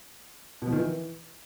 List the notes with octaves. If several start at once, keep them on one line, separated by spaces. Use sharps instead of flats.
B2
F3
D#3
E3